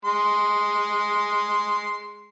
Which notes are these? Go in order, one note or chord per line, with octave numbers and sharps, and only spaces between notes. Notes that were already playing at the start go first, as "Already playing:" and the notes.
G#3 C6